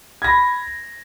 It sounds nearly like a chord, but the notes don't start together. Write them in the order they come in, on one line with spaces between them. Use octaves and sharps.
G#6 A#6 B5